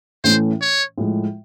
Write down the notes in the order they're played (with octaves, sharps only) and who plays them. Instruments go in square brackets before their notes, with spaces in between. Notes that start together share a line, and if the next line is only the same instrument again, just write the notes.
[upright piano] A2 E3 A3 C#4 [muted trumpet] C5
[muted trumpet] C#5
[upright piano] A2 F3 G#3